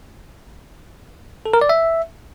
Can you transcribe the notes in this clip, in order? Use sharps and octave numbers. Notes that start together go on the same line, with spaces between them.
A4
A#4
D5
E5